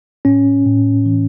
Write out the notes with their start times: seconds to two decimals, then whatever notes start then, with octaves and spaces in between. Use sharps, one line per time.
0.25 A2 C#4
0.66 A2
1.05 E3